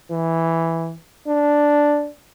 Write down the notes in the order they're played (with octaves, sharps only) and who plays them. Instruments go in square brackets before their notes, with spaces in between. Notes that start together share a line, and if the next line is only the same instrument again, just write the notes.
[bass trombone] E3
D4